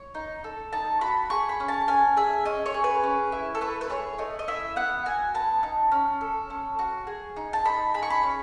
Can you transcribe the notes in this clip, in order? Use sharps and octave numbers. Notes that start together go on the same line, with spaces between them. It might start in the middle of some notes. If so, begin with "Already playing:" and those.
Already playing: C#5
D#4
A4
D#4 A5
F#4 B5
G#4 C#6
B5
C#4
A5
C#4 G#5
G#4 E5
C#4 D#5
C#5
G#4
B4
C#4
E4
A4
A3 B4
B4
G#4 C#5
A3 D#5
D#5
E4 E5
B3 F#5
F#4 G#5
B3 A5
D#4
C#4
A4
C#4
F#4
G#4
D#4
A5
D#4 B5
G#4 B5
C#6
B5
C#4